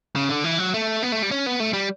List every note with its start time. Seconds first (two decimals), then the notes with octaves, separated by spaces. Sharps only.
0.16 C#3
0.29 D3
0.44 E3
0.58 F#3
0.74 A3
1.03 B3
1.12 A3
1.22 G3
1.31 C#4
1.46 B3
1.60 A3
1.73 G3